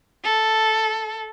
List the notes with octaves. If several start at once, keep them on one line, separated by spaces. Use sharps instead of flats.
A4